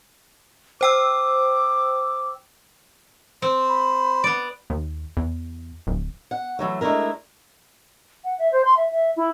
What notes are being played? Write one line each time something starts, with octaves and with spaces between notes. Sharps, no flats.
C5 G5 D6 E6
C4 C5
B5
B3 D5
D#2
E2
D1
F#5
E3 F#3 A3
G#3 A3 D4 E4 A#4
F#5
E5
C5
C6
E5
E5
E4